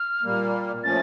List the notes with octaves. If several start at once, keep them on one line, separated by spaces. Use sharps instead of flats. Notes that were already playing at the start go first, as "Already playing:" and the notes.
Already playing: F6
A#2 G3 A#3
A#2 F3 A3 C#4 A6